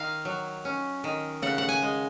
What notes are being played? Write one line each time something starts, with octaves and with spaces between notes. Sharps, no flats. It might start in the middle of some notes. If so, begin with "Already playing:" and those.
Already playing: D#3 F5
F#3
C#4
D#3
C#3 F#5
F#5
G#5
G#3